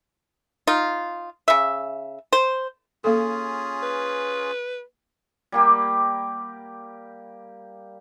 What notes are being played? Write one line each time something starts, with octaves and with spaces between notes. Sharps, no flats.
D#4 F4
C#3 E5
C5
A#3 C#4 F4 G#4 A4
B4
G3 A#3 G4